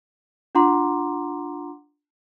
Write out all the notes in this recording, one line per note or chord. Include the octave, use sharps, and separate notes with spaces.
D4 F4 F#5 A#5 C6 D6